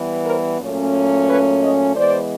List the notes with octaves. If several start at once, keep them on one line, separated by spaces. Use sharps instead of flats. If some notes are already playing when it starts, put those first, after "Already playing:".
Already playing: E3 G3 B3
A#4 C5
A#2 F#3 A3 C#4
B4 C#5
C#5 D#5
E3 G#3 B3 C5 D5